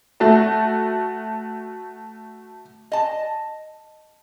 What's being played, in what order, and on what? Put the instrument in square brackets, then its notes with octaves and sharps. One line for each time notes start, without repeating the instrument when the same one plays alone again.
[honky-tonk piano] A3 F#4 A5
[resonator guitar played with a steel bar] D#5 A5